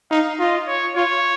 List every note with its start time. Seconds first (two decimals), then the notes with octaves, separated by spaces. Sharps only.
0.11 D#4 F5
0.39 F4 D#5
0.67 C#5
0.96 F4 C#5